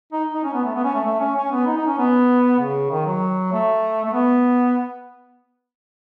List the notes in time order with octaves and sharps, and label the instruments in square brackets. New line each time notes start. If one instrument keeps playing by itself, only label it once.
[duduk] D#4
D#4
C#4
B3
A3
B3
C#4
A3
A3
C#4
C#4
B3
D#4
D#4
C#4
B3
C#3
D#3
F#3
A3
A3
B3